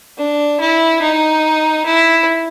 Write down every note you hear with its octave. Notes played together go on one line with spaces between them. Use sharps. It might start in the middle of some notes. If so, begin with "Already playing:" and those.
D4
E4
D#4
E4